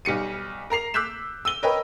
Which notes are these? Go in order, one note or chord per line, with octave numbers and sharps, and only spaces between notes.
B1 G3 C#7 D#7
A#4 A#5 C7 F7
D6 E6 F#6 G6 B6 E7
E6 D#7 G7
A#4 B4 C#5 D#5 G5